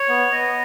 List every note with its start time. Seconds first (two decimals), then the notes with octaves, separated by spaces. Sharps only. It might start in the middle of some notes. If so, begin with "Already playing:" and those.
Already playing: C#5
0.09 B3
0.32 B3 D#5